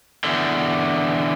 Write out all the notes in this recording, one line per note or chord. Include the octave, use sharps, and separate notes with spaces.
E2 D3